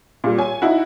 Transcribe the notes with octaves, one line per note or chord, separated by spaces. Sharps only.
A#2 G3
C#5 G#5
D#4 E4 F#4